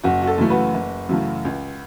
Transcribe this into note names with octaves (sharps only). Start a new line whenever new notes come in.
F#1 F#4
F#4
A4
F#2 C#3 E3 A3
F#4 B4
F#1
F#2 C#3 E3 A3
C#2